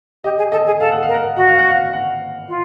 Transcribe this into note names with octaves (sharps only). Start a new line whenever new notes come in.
G4 D#5
G#4
A4 D#5
G#4
A4 F5
F#5
F5
A#4
F#5
F5
F#4 F#5
F5
F#5
F5
F#5
F4